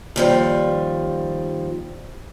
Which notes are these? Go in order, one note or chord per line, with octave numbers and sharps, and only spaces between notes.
D#2 F3 G3